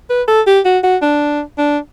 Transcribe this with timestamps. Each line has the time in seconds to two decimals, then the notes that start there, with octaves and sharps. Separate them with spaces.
0.10 B4
0.28 A4
0.47 G4
0.65 F#4
0.84 F#4
1.02 D4
1.58 D4